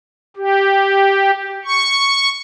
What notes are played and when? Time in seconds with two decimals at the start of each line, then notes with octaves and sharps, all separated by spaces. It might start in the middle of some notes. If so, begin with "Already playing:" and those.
0.36 G4
1.65 C#6